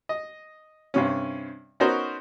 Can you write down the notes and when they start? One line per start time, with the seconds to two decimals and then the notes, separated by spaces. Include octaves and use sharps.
0.09 D#5
0.94 G2 C3 C#4
1.80 B3 C#4 D#4 F#4 A#4 C5